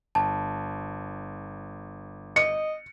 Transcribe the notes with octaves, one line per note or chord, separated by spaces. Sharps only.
G1 A5
D#5 C#7